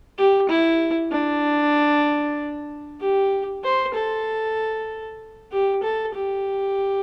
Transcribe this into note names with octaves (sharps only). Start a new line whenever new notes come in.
G4
E4
D4
G4
C5
A4
G4
A4
G4